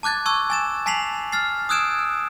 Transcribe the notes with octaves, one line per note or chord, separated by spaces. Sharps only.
A5 D6 F#6 G#6 A6
A5 C#6 E6 G#6
G#5 A6 E7
G#5 A5 B6 C7 F7 F#7
F6 A6 C7
D#6 E6 F#6 G#6 D7 E7